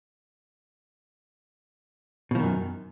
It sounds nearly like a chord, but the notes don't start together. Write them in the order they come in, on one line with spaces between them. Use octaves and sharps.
B2 F3 D#3 F#2